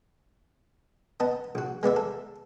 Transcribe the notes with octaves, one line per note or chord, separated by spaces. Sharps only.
B3 D#5 A5
A#1 F#4
G#3 B3 D5 E5
A4